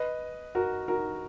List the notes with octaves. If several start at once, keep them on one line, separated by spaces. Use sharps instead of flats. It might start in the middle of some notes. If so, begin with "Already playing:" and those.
Already playing: B4 D#5
F#4 A#4
F#4 A#4